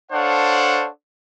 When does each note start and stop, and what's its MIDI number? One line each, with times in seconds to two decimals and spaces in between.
0.12 0.88 62
0.12 0.88 69
0.12 0.88 72
0.12 0.88 73
0.12 0.88 77
0.12 0.88 78